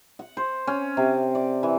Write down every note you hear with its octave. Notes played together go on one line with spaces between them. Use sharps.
F#5
C5
C#4
C3
D5
E3